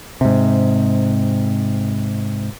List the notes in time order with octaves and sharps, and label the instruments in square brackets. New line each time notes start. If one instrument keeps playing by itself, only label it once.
[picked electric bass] G#2 C3